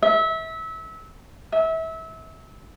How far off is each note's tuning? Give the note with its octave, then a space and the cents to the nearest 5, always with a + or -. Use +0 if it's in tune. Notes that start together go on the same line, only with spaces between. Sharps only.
E5 -25
E5 -25